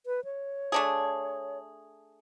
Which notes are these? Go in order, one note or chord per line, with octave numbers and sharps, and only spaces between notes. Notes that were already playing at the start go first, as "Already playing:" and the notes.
B4
C#5
A3 D4 G#4